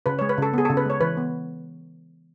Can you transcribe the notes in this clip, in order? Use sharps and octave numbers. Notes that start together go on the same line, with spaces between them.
C#3 B4
G#3 C#5
B4
C#3 A4
B3 G#4
A4
C#3
B4
G#3 C#5
E3 B4
B3